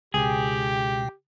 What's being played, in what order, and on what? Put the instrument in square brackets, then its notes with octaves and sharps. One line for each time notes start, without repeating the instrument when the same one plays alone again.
[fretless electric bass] C#2 [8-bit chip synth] B2 G5 [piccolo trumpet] G4 [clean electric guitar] G#4